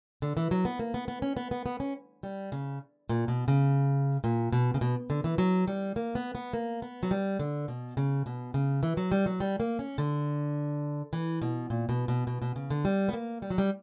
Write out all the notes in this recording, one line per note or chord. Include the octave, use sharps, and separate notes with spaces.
D3
E3
F#3
B3
A#3
B3
B3
C#4
B3
B3
B3
C#4
G3
C#3
A#2
B2
C#3
A#2
B2
C#3
B2
D3
E3
F#3
G3
A#3
B3
B3
A#3
B3
F#3
G3
D3
B2
C#3
B2
C#3
E3
F#3
G3
F#3
G3
A#3
C#4
D3
E3
B2
A#2
B2
B2
B2
B2
C#3
D3
G3
B3
A#3
G3
F#3
G3